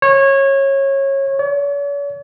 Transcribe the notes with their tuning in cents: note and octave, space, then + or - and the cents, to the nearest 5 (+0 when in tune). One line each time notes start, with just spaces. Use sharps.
C#5 -20
C#5 +45